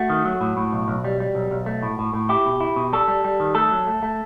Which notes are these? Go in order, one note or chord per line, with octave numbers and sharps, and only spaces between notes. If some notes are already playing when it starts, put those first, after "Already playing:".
Already playing: A3 F#4
D#3
F#3
A2
A2
B1
B1
G3
G3
B1
B1
A3
A2
A2
A2
E4 G4
B2
E4
B2
G3 A4
G3
G3
D#3
A3 A4
F#3
A3
A3